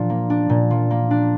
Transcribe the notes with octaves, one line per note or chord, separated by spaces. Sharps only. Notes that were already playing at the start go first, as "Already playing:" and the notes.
Already playing: A#2 F3 D4
A#3
D4
A#2
F3
A#3
D4